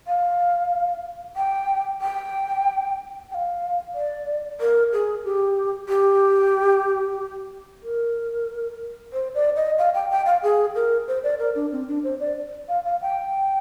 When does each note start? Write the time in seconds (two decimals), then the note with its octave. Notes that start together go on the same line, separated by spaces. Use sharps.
0.07 F5
1.36 G5
2.01 G5
3.31 G5
3.34 F5
3.95 D5
4.60 A#4
4.93 G#4
5.25 G4
5.89 G4
7.83 A#4
9.13 C5
9.35 D5
9.56 D#5
9.78 F5
9.94 G5
10.11 G5
10.26 F5
10.43 G#4
10.75 A#4
11.08 C5
11.23 D5
11.39 A#4
11.55 D4
11.72 C4
11.88 D4
12.04 C5
12.20 D5
12.69 F5
12.85 F5
13.02 G5